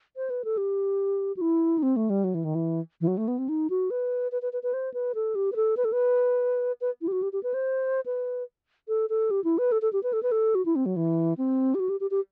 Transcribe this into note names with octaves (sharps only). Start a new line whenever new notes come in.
C5
B4
A4
G4
F#4
E4
D#4
C4
A3
G3
F#3
E3
D#3
E3
E3
F#3
A3
B3
C4
D#4
F#4
B4
B4
B4
B4
B4
C5
B4
A4
G4
B4
A4
B4
A4
B4
B4
E4
G4
F#4
G4
G4
B4
C5
B4
A4
A4
G4
E4
B4
A4
A4
G4
B4
A4
B4
A4
F#4
E4
C4
F#3
E3
C4
G4
F#4
G4
G4
G4